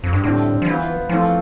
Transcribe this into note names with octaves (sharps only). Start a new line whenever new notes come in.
F2
G2
A2 D3 G3 C4
F3
E3 B3 F4 C5
E3 F3 A3 C4 F4